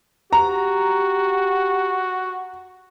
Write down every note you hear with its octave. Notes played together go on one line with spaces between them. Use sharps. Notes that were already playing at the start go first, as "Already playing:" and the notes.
F#4 G4 A#5